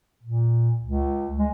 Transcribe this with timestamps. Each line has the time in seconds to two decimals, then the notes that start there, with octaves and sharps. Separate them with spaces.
0.23 A#2
0.82 C#2
1.38 G#3